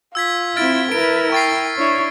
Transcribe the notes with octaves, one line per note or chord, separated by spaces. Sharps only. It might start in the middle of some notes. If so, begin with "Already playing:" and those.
F4 E6 G#6 B6
C4 E4 F6 A6 D7
E4 A#4 B4 D7
G5 C#6 A6 C7
D4 E4 C#5